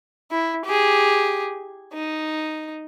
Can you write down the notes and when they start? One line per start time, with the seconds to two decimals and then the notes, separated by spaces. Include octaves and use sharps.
0.31 E4
0.65 G4 G#4
1.93 D#4